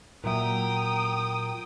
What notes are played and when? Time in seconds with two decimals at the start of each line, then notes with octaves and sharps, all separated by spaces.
0.24 A#2 F#3 E5 G5 A#5 D#6